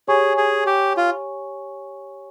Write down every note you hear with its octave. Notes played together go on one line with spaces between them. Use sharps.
G4 G#4 C#5 G#5 C#6
G#4
G4
F4